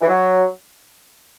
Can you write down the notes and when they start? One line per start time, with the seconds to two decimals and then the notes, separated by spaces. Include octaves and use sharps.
0.01 E3
0.08 F#3